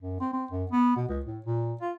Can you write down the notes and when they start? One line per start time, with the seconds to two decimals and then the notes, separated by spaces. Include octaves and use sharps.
0.02 F#2
0.21 C4
0.33 C4
0.51 F#2
0.71 B3
0.96 B2
1.08 C#2
1.26 A2
1.46 A#2
1.81 F4